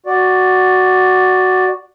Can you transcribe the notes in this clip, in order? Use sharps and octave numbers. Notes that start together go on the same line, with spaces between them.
F#4 D5